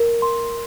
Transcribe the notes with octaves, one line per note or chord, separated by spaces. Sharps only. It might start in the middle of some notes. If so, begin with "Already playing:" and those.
Already playing: A#4
C6